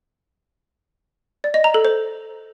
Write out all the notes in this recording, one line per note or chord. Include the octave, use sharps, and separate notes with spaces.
D5
D#5
A#5
A4
C5